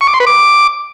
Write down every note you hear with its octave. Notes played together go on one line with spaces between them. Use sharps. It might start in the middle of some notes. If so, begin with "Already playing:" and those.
C#6
D6
C6
B4
D6